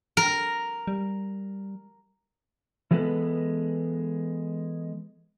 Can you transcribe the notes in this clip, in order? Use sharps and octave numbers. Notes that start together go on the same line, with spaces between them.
A#4
G3
E3 F#3 G#3 B3 A4 B4